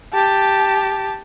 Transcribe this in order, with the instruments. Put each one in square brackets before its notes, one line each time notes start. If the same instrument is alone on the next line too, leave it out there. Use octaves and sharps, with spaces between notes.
[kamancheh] G4 A5